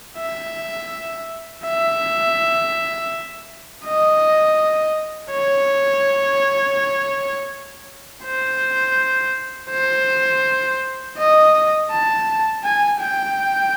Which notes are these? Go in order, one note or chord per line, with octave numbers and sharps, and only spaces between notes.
E5
E5
D#5
C#5
C5
C5
D#5
A5
G#5
G5